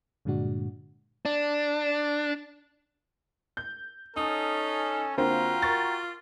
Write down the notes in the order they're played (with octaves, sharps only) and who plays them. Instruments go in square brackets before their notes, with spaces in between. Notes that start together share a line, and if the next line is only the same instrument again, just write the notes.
[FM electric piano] G2 A#2 D3 G#3 D4 F#4
[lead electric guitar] D4
[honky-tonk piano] G6
[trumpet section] C#4 A4 [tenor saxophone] D#4 [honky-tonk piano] D#6
[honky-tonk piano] D3 A#3 C4 [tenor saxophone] F4 [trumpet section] F#4 G5 A#5
[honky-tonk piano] A#4 C#6 A6